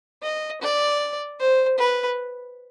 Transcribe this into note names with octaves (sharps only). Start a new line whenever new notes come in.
D#5
D5
C5
B4